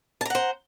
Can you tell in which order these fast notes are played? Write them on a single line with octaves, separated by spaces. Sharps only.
A5 A#5 F#5 C5